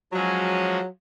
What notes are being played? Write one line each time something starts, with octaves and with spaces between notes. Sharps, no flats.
F3 F#3 G#3 C#4 G#4